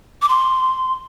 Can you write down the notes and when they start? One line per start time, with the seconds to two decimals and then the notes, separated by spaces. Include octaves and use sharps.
0.22 D6
0.29 C6